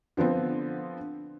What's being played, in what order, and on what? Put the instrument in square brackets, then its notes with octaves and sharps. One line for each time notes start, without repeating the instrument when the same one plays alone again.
[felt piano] D3 F3 B3 C4